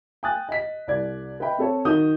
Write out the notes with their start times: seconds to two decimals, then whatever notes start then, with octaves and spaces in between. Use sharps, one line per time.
0.23 G5 G#5 D#6 F#6 A6
0.49 D#5 B6
0.87 C2 D5 G#6
1.40 B4 D#5 E5 G5 B5
1.58 C4 A4 C#5
1.85 D#3 F#4 D#6 G6 G7